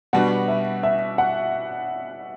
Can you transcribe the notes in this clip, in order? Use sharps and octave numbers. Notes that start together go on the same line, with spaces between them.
B2 G3 B3 D4 F#4 F#5
E5
E5
F#5